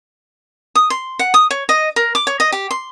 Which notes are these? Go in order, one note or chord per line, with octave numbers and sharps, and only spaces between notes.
D#6
C6
F#5
D#6
C#5
D#5
A#4
D6
C#5
D#5
G4
C6